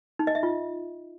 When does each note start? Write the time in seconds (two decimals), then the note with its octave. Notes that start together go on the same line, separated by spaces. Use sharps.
0.19 D#4
0.27 D#5
0.35 E5
0.43 F4